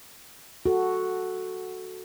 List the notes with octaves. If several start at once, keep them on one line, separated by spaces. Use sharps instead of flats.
F#4 A4